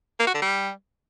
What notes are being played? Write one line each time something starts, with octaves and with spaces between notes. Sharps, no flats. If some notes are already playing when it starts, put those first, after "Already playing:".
A#3
F#4
D3
G3